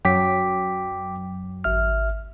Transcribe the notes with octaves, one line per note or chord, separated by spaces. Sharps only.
F#2 F#3 G5 D6 B6
G#1 E5 F6